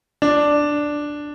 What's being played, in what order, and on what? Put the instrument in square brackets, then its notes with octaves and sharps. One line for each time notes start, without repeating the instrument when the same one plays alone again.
[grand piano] D4